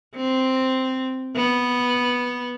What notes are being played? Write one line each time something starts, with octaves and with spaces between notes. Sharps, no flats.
C4
B3